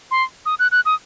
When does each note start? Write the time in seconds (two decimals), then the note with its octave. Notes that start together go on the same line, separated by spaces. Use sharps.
0.11 C6
0.46 D#6
0.59 F#6
0.72 F#6
0.85 D#6